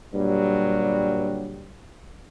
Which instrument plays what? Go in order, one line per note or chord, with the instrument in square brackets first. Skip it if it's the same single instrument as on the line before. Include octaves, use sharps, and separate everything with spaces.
[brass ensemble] G2 A#2 D3 F#3 G3